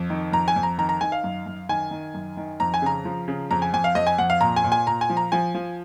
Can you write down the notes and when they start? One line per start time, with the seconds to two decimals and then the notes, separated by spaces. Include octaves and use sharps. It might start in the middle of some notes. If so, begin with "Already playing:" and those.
Already playing: F2
0.10 D#3
0.32 F2 A#5
0.48 G#5
0.56 F2
0.63 A#5
0.78 D#3 A#5
0.89 A#5
1.01 D#3 G#5
1.12 F5
1.24 F#2
1.46 F#2
1.69 D#3 G#5
1.91 D#3
2.14 F#2
2.37 D#3
2.60 F2 A#5
2.74 G#5
2.82 C#3 A#5
3.05 F3
3.28 C#3
3.51 F2 A#5
3.62 G#5
3.73 F2 G#5
3.84 F5
3.95 F2 D#5
4.07 G#5
4.18 F2 F#5
4.30 F5
4.41 A#2 A#5
4.56 G#5
4.64 A#2
4.72 G#5
4.87 A#2 A#5
5.01 G#5
5.10 F3
5.17 A#5
5.32 F3 G#5
5.55 F3